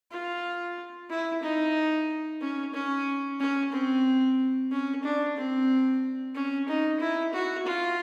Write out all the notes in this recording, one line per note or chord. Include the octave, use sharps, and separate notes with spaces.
F4
E4
D#4
C#4
C#4
C#4
C4
C#4
D4
C4
C#4
D#4
E4
F#4
F4